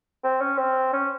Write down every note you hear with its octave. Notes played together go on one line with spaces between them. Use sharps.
C4
C#4
C4
C#4